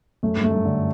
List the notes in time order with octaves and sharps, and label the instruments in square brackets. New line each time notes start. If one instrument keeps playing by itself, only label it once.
[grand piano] F#2 [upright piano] A3
[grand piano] G2
[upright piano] A3
[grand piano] F#2
[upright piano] D3